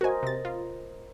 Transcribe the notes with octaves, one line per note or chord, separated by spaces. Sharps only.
F#4 A#4 C5 D#5 G#5
C3 A6
F4